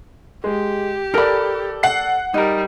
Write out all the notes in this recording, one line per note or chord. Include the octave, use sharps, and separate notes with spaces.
G#3 G4
A4 A#4 D5 B5
F#5 C7
G3 D#4 A#4